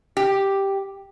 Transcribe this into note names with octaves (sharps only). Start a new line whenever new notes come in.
G4